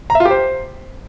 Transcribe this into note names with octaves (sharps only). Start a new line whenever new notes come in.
A#5
E5
F4
G4
C5